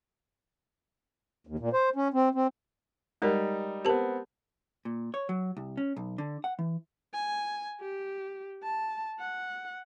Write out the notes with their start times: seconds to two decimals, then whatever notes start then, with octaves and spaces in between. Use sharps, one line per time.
1.47 D#2
1.59 A#2
1.73 C5
1.96 C#4
2.14 C4
2.35 C4
3.22 G3 G#3 D#4 A#4
3.85 B3 C4 G4 A#4 A5
4.85 A#2
5.14 C#5
5.29 F#3
5.57 C2
5.77 C#4
5.97 B1
6.18 D3
6.44 F#5
6.59 E3
7.14 G#5
7.80 G4
8.63 A5
9.19 F#5